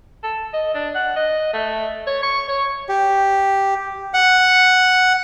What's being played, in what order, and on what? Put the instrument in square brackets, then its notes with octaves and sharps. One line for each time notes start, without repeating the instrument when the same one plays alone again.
[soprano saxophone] A4
D#5
D4
F#5
D#5
A3
C#5
C#6
C#5
[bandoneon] G4
F#5